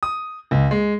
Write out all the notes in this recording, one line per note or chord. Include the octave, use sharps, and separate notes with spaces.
D#6
C#2
G#3